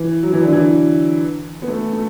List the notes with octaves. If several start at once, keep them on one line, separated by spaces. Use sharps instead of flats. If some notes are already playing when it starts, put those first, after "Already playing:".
Already playing: E3
F#3
E3
D3
E3
B3
A3
A3